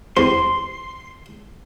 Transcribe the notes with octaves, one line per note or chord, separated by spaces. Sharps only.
E2 C4 G4 C6